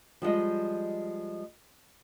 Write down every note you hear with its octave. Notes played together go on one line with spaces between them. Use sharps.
F3 G3 G#3 D#5